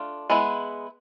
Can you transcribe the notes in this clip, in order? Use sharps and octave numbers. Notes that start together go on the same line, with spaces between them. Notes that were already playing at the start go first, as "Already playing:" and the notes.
Already playing: A3 D4 F4
G#3 B3 E4